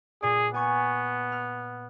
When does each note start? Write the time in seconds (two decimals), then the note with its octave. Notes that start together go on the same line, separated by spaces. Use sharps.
0.22 A#2 G#4 D5
0.54 B3 G#5 C#6 G#6
1.32 F6